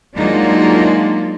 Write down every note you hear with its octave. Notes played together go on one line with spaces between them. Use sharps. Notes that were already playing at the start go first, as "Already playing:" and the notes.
F#3 G#3 A#3 D4 D#4 F4